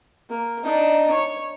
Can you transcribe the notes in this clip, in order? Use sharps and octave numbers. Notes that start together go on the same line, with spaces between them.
A#3
D4 D#4
C#5